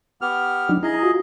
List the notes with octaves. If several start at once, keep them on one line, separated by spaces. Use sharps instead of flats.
B3 G4 F6
F#3 D4 D#4
E4 G#4 D#5 A#5
F4 F#4